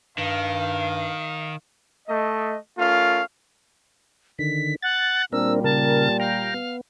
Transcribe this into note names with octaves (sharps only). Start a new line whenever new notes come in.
G2 D#3 F5
A3 D#5
A3 C#4 F4 A#4 F5
D3 D#3 B6
F#5 A6
A#2 G3 C4 D4 A#4 E6
C#3 A#4 A5
F5 G5 A#5
B3